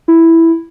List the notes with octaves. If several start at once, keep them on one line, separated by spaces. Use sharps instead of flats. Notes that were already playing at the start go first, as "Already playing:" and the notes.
E4